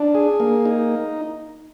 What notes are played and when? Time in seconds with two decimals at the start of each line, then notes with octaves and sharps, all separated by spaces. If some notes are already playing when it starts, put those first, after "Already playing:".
Already playing: D4
0.15 G#4
0.40 A#3
0.65 D#4